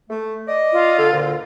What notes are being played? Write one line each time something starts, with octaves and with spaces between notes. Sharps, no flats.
A3
D5 D#5
F4
D3 A4
D2 A#2 D3